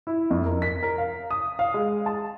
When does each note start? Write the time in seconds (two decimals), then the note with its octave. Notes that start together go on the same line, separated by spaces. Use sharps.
0.07 E4
0.30 F2
0.46 A#4
0.62 B6
0.83 A#4
0.98 F5
1.31 D#6
1.59 F5
1.74 G#3
2.06 A5